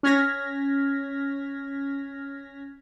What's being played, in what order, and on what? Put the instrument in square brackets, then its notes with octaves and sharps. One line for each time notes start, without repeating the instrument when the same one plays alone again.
[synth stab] C#4 F6 G#6 A#6 B6